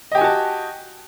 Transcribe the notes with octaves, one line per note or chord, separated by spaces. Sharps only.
F#4 G4 D#5 G#5 A5